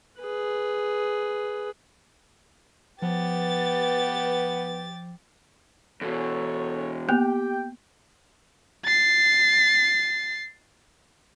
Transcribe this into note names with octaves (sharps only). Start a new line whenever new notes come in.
G#4 B4
F3 B3 G4 B4 A6
E2 B2 A4 C#5
A#3 B3 G4 G5
A6 C7